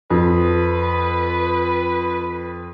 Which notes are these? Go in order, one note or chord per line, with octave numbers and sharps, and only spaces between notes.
F2 B4